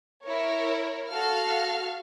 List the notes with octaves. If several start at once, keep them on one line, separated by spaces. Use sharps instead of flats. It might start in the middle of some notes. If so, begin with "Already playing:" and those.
E4 A#4 C#5
F#4 A4 F5 F6